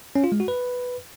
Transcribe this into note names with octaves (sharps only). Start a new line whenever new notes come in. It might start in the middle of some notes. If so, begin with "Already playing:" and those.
C#4
F4
G#3
F#4
B4